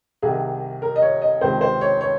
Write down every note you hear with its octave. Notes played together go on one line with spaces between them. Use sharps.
C2 C3 D#3 G#4
A#4
D#5
C#5
D#5
C#2 C3 D#3 C5
C5
C#5
C#5